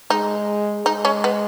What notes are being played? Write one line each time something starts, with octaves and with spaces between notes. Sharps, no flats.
G#3 D#4
G#3 D#4
C#4
B3